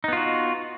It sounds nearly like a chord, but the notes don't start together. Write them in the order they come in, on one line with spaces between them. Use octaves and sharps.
D#4 B3 F4 F#4